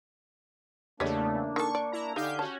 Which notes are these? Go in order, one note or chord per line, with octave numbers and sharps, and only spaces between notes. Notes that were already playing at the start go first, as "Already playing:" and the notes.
E2 C#3 A3 A#3 D4 G4 C#5 D#5
D#3 A4 C#6
D5
E4 A#5
D3 D#4 G4 F5 G#5 G6
C#4 F#4 A5